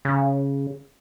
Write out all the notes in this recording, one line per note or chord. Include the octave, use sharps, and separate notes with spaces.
C#3